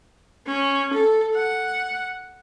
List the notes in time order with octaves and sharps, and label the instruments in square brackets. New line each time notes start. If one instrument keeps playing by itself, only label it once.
[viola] C#4
A4
F#5